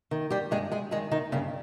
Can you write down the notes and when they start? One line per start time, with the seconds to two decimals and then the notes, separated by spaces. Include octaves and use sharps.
0.11 D#3
0.30 G3 G4
0.51 G2 G#3 G#4
0.72 G#3 G#4
0.91 D#3 G#3 G#4
1.11 D#3 D#4
1.32 G2 C#3 C#4